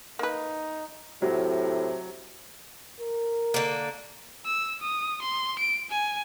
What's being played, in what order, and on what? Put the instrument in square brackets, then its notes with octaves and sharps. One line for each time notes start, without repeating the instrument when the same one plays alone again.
[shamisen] A#3 B4 [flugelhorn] D#4
[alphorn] A2 [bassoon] C3 [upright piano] F#3
[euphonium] A#4
[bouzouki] D3 A#3
[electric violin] E6
D#6
C6
D7
G#5